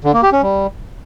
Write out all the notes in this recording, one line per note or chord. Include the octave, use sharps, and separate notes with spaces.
D3
A#3
G4
C#4
G3